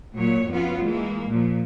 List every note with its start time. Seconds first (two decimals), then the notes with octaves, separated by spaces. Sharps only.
0.16 A#2 F#3 C#5
0.49 F2 B3 C#4 F4 F#4
0.83 E3 G#3 A#3
1.31 A#2 F3